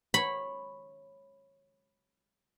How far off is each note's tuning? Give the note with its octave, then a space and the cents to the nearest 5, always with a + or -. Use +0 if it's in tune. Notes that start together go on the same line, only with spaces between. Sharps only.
C#5 -15 B5 +0